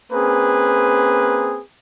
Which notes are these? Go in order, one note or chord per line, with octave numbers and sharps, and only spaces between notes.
A#3 C4 C#4 G#4 B4